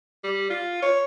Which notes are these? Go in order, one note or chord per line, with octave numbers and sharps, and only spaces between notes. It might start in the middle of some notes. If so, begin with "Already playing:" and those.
G3
F4
C#5